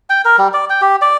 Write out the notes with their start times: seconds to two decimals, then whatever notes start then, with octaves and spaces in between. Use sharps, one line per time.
0.10 G5
0.25 A#4
0.38 G3
0.53 D5
0.70 G5
0.81 G4
1.02 D5